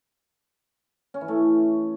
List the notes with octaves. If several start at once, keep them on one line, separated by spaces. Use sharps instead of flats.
C#4
E3
A3